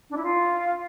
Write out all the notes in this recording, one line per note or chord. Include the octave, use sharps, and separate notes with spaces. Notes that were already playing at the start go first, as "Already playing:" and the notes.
D4
E4
F4